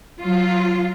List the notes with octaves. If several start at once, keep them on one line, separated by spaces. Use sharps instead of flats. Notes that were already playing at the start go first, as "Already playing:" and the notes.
F#3 F4